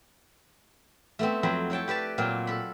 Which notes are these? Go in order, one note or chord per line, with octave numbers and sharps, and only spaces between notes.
A3 B3 C4
F2 F#3 C4 B5
E4 C#5 G5 A5
G4 B4 D5 A5
A#2 F#3 C4 F4
A4 B5